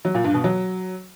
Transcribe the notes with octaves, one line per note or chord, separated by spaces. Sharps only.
F#3
A#2
G2
B2
F#3